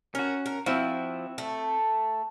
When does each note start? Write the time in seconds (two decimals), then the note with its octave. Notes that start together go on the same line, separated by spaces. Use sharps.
0.15 C#4 F#4 A#4
0.46 A#4
0.66 F3 C4 E4 F#4
1.38 A3